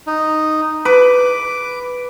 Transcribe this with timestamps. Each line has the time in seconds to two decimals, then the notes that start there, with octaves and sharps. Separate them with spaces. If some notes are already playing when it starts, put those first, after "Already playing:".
0.07 D#4
0.85 B4 D6